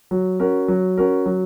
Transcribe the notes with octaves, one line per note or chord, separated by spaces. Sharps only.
F#3
C#4 F#4 A#4
F#3
C#4 F#4 A#4
F#3